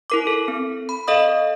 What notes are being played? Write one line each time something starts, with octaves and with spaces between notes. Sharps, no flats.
E4 A#4 D6
A4
C4
B5
A4 D#5 F5 D#6